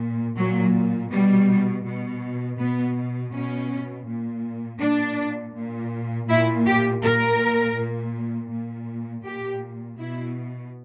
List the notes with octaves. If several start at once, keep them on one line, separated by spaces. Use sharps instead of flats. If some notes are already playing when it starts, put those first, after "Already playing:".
Already playing: A#2
A#2 F#3
B2 G3
B2
B2 B3
B2 C#4
A#2
A#2 D4
A#2
A#2 E4
G4
A#2 A#4
A#2
A#2
A#2 G4
B2 E4